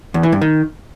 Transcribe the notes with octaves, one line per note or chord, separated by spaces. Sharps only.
E2
E3
G2
D#3